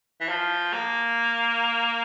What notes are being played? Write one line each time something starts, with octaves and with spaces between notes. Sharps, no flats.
E3
F3
A#3